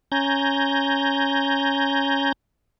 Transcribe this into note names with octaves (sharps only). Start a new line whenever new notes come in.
C#4 G#5 A#5 G6